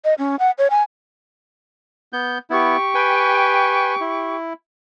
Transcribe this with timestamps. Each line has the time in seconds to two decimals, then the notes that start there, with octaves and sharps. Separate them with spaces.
0.05 D#5
0.18 C#4
0.39 F#5
0.58 C#5
0.71 G#5
2.13 B3 G6
2.50 B3 E4 G4 C#6
2.95 B4 G5 G#5
4.01 E4